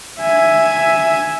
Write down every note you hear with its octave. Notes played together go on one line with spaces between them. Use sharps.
E5 G#5